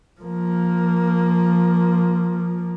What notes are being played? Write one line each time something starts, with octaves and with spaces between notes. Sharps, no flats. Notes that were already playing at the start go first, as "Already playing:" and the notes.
F3 A#3